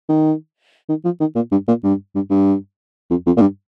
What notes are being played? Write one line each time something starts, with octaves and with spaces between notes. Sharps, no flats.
D#3
D#3
F3
D#3
A#2
G2
A#2
G2
G2
G2
F2
F2
A#2
G2